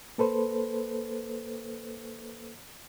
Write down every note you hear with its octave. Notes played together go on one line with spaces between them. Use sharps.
A#3 A4 B4 C5